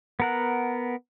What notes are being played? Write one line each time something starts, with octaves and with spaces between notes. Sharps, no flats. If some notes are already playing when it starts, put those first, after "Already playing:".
B3 A#4 F#5